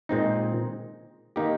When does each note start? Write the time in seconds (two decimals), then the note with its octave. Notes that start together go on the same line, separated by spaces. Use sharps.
0.09 A#2 G#3 C4 D#4
1.36 D#3 A#3 D#4 G4